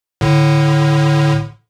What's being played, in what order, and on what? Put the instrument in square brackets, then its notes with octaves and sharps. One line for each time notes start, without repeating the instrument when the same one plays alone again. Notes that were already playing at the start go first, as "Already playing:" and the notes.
[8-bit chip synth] A2 D3